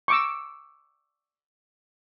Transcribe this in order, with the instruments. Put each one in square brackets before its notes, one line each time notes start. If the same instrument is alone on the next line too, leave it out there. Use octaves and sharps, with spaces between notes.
[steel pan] C#6 D6 E6